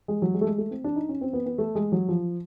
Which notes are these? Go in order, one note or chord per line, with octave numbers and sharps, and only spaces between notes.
G#3
F#3
G#3
A3
G#3
A3
C4
D4
D#4
C#4
C4
B3
B3
A3
G#3
F#3
F3